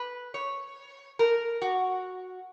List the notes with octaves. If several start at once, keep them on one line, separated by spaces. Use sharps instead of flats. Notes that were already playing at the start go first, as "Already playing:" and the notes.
Already playing: B4
C#5
A#4
F#4